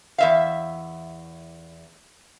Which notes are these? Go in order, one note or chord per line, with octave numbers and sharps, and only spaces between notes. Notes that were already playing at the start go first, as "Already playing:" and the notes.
E2 E5 F5